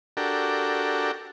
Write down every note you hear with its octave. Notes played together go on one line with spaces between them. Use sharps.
D4 F#4 G4 A4 A#4